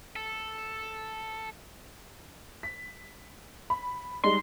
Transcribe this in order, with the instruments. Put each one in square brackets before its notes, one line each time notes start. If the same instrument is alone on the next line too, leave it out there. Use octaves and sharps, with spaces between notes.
[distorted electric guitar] A4
[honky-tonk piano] B6
B5
[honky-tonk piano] G3 G#3 D#4 [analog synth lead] C6